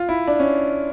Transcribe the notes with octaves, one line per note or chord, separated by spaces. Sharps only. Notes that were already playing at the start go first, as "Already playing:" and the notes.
Already playing: F4
E4
D4
C#4